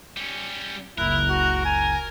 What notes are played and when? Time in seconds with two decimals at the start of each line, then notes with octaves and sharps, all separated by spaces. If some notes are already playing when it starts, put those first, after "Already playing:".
0.17 G3 C#4
0.98 F#1 C#2 E4 A#4 F#6
1.29 F#4
1.65 G#5 A#5